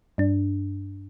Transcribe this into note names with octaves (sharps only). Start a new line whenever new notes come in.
G2 D4